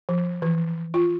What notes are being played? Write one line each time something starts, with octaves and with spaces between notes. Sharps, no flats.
F3
E3
F4